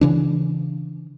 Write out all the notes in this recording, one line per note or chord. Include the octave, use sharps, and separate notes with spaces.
C#3 E3 D4